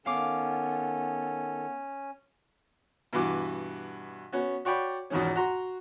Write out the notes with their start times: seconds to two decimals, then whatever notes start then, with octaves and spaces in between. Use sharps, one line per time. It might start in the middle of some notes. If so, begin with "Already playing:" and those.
0.06 D#3 B3 C#4 A4 F5 D6
3.13 G2 B2 E3 D6
4.32 B3 C#4 F#4
4.65 F#4 C#5 D5 G5 B5
5.10 E2 G#2 B2 D#3 F3 C#4
5.36 F#4 A#5 C6